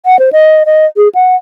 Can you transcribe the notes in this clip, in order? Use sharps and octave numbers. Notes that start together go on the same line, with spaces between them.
F#5
C5
D#5
D#5
G#4
F#5